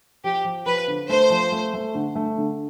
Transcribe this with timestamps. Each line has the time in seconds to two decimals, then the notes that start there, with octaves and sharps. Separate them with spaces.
0.24 F3 G4
0.45 F3
0.66 F3 B4
0.88 D3
1.09 A3 C5
1.30 F3
1.52 A3
1.74 A3
1.95 D3
2.15 A3
2.38 D3